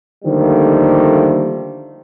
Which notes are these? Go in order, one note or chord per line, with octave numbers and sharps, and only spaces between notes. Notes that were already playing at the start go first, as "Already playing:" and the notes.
D3 D#3 F3 G3 A3 A#3